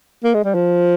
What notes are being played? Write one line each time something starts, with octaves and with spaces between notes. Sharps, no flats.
A#3
G#3
G3
F3